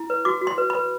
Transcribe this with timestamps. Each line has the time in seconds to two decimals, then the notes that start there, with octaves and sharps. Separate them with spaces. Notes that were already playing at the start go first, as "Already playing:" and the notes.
Already playing: E4
0.10 B4
0.25 F#4 D6
0.42 F#4
0.47 C6
0.58 B4
0.70 B5
0.75 B4